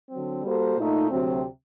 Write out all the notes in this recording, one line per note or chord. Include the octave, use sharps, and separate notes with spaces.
D3 F#3 C4
G3 A#3 F#4 A4 C5
A#2 A3 D#4
D2 C3 F#3 C4